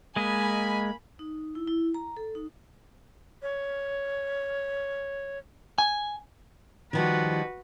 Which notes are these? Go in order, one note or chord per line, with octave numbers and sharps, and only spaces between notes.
G#3 A#3 D#5 G#5 B5
D#4
E4
E4
A#5
A4
D#4
C#5
G#5
D#3 F3 G3 F#4 B4